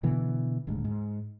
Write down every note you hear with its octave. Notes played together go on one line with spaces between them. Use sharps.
B2 D3 E3 B3
D#1 D2 G#2
G#2